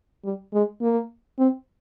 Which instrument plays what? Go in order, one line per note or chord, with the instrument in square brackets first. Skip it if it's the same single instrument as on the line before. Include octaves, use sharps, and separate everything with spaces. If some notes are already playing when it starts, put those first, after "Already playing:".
[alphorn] G3
G#3
A#3
C4